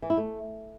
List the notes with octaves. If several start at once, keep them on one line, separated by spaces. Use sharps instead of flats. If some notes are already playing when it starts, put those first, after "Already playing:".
E3
E4
A3